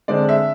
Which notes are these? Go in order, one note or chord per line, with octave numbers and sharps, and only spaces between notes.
D3 G#3 C4 D5
E5